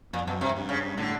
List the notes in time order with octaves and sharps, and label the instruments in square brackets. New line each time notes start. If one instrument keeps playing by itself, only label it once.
[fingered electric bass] F2 [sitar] A#2
[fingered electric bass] F#2 [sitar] B2
[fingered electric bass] G2 [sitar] C3
[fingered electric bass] G2
[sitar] C#3
[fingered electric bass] A2 [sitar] D3